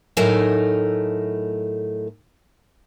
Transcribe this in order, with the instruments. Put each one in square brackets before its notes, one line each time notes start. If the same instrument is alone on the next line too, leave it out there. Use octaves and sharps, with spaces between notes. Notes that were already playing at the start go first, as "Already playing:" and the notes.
[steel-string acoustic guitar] A2 F#3 A3 D#4 A#4 G#5